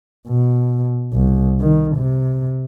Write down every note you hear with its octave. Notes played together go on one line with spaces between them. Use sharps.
B2
C2
D#3
C3